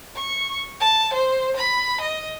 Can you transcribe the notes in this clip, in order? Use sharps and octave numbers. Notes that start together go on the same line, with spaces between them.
C#6
A5
C5
B5
D#5